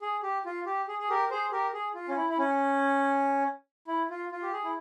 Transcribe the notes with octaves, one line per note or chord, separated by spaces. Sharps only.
G#4
G4
F4
G4
G#4
G#4
G4 A#4
G#4 C5
G4 A#4
G#4
F4
C#4
E4
E4
C#4
E4
F4
F4
G4
G#4
E4